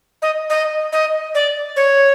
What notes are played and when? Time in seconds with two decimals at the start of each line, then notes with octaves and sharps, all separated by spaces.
0.22 D#5
0.50 D#5
0.92 D#5
1.35 D5
1.76 C#5